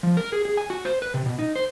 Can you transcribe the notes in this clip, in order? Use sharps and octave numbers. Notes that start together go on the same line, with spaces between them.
F3
A#4
G#4
G#4
G#5
F#4
C5
B4
C3
B2
D#4
C5